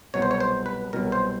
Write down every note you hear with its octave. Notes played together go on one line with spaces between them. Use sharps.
C2 B2 F#3 C#5
C5
C#5
C5
B4
C2 B2 F#3 A#4
C5